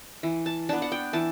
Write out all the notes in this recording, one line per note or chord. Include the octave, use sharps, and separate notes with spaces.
E3
A5
B3 D4 A5
F#5
G5
E3 A5